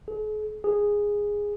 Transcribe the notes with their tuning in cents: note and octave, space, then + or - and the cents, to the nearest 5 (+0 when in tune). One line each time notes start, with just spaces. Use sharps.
G#4 +45
G#4 -10